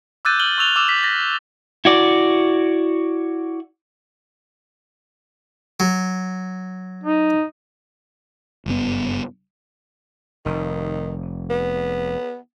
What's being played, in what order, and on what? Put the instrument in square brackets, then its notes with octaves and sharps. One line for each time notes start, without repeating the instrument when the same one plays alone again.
[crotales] D6 E6 F#6 G6 A6 D#7
F6 F#7 G7
C#6 E6 F7 G7
D6 E6 E7
B6
A6 A#6
[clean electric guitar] E4 F#4 D5
[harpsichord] F#3
[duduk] D#4
[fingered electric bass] F#1 G2 C#3 B3
[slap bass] F1 [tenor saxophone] D#3
[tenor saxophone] B3